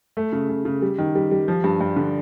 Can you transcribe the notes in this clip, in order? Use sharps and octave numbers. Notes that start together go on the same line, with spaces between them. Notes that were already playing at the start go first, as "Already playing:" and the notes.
A3
C#3
C#3
C#3
G3
D#3
G3
G3
F3
G2
G2
D3